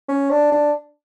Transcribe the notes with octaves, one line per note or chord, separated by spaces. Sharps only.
C#4
D4
D4